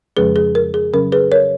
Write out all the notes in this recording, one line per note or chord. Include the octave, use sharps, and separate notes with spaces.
F2 C#3 F3 G#3 C#4 G#4 B4
G#4
A#4
G#4
C#3 F#3 C#4 A#4
G#4 B4
A#4 C#5